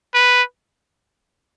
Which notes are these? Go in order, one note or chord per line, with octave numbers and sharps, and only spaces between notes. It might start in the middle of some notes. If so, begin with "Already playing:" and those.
B4